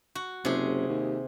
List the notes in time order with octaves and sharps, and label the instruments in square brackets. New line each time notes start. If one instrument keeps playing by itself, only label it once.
[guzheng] F#4
[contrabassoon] F#1 [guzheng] C3 G#4
[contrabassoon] D#2